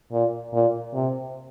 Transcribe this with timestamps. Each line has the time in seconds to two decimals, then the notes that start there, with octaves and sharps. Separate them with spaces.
0.12 A#2
0.53 A#2
0.94 C3